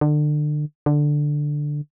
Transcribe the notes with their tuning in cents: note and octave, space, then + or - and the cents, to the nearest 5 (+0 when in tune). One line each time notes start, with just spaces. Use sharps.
D3 +30
D3 +5